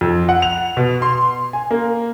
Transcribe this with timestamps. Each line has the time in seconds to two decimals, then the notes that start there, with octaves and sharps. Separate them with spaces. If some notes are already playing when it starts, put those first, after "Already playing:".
0.01 F2
0.29 F#5
0.42 F7
0.77 B2
1.02 C6
1.53 G#5
1.71 A#3